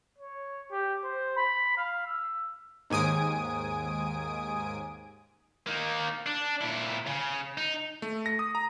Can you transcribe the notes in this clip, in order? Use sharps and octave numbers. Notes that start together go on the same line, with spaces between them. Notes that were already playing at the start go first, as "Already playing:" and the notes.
C#5
G4
C5
B5
F5
E6
D#2 G#2 G#5 D#6 D7
A#3 D#4
D4
A#2 E4
C#3
D#4
A3
A#6
D#6
A#5